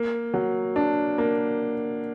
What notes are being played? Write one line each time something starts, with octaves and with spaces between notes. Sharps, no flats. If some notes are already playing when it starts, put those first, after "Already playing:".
Already playing: A#3
F#3
D4
A#3